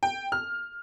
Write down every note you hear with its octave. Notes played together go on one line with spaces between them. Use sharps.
G5
F6